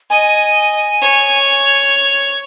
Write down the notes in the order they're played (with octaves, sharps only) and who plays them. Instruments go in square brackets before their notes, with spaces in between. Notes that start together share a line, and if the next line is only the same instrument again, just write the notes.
[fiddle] D#5 [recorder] G#5
[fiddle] C#5